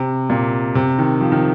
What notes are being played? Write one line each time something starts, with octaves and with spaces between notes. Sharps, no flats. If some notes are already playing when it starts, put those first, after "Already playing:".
Already playing: C3
A#2
C3
D#3
F3
D#3